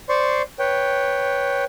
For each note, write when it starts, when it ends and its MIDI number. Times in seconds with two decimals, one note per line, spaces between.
0.09 0.42 72
0.09 0.42 74
0.09 0.42 84
0.09 0.42 85
0.59 1.64 71
0.59 1.64 73
0.59 1.64 79